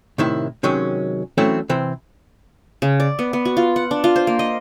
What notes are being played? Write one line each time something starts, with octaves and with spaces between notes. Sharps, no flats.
A2 C3 D#3 E4
C3 D#3 F#3 G#3 C#4
E3 F#3 A3 C4 C#4 E4
C3 E3 C4 C5
C#3
D5
B3
B3
F#4
F4
F#5
D4
F4
C5
A#3
D#5